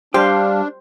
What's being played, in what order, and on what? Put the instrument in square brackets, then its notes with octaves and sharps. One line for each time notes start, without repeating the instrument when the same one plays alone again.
[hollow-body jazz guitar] G3 G4 [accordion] D4 [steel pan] C5 [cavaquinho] F5